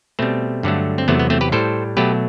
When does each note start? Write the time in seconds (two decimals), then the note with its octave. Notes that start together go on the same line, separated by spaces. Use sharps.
0.19 B2 G3 A3 C4
0.63 G2 D3 F#3 A3
0.98 C4
1.08 E2 C3 F#3 A3 B3
1.19 B3
1.30 A3 C4
1.41 G4 B4
1.52 A2 G3 A4 C5
1.97 B2 F#3 A3 G4 B4